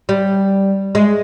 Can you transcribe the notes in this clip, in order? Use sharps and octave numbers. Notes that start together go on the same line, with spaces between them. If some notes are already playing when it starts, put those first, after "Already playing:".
G3
G#3